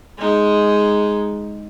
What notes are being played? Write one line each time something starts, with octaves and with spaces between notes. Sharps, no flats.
G#3 D#4